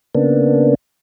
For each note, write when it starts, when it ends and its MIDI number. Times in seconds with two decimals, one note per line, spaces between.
0.15 0.75 49
0.15 0.75 58
0.15 0.75 59
0.15 0.75 62